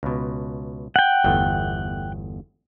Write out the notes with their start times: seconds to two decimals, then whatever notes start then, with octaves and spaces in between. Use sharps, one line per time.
0.03 C#2 B2
0.96 F#5 G5
1.24 G1 E2 A3